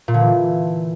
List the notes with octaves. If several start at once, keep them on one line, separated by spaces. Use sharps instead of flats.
A#2
D3
E3